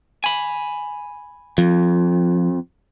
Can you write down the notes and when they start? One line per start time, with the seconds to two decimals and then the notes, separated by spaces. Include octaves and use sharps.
0.24 G#5 B5
1.58 F2 F3